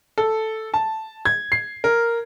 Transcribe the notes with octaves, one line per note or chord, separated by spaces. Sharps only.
A4
A5
G#6
C7
A#4